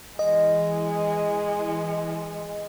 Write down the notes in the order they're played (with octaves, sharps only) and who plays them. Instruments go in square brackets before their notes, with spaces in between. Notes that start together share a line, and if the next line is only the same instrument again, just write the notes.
[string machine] E3 [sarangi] G#3 [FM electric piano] D#5